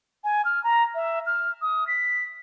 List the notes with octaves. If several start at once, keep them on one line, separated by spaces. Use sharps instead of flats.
G#5
F6
A#5
E5
F6
D#6
B6